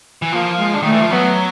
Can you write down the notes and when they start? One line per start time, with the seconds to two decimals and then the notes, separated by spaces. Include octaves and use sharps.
0.22 E3
0.32 F3 A#3
0.59 G#3
0.74 D3
0.82 D#3 A3
0.92 E3
1.02 F3
1.11 F#3 B3